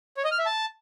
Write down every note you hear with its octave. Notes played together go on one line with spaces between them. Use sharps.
C#5
D#5
F6
E5
A5